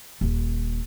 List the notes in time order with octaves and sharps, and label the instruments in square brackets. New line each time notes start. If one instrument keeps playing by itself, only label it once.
[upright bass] D#1